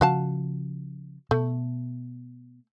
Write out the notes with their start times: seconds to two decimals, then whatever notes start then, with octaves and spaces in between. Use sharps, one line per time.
0.01 C#3 F3 F#4 F5 A5
1.31 B2 A3